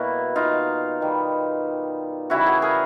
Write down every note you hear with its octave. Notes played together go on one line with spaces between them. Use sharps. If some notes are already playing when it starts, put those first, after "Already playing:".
Already playing: B2 G3 A#3 E4 F#4
D#4 F4
D#3 G3 B3 D#4
C#3 E3 G3 E4 F#4
F#4 G#4
G#4 A#4